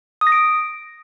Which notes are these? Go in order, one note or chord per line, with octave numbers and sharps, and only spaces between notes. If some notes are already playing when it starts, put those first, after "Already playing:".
D#6
A#6
D7